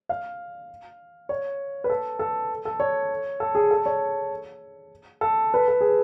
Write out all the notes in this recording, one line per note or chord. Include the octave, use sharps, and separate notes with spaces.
F5
C#5
B4
A4
A4
A4
C#5
A4
G#4
A4
C#5
A4
B4
A4
G#4